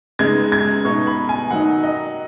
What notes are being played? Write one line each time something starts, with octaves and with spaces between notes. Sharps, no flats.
C#3 G#3 B3 D#4 G#6
G#6
B2 B3 D#4 C#6
B5
G#5
D#3 F#3 D#4 F#5
D#5